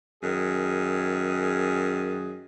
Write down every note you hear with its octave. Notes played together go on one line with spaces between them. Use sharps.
F#2 D#3 G#4